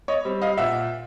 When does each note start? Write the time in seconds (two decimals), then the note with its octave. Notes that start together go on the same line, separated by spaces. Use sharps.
0.08 C#5 D#5
0.25 G3 C4
0.42 D#5 F5
0.58 A#2 E5 F#5